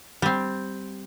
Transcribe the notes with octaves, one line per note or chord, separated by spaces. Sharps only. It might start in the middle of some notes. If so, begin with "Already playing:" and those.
G3 C4